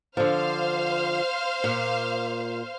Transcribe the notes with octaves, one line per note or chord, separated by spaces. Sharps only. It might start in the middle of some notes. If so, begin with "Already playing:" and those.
D3 F3 C5 F5 F6
A#2